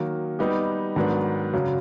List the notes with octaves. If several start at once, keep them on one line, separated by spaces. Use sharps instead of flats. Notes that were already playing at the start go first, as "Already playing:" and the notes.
Already playing: D#3 F#3 A#3
G3 B3 D#4 G4
G#2 D#3 F#3 B3 D4
F#2 C#3 F#3